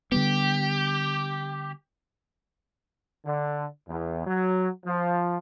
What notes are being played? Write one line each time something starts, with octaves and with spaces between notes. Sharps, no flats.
D3 G3 B3 G4
D3
E2
F#3
F3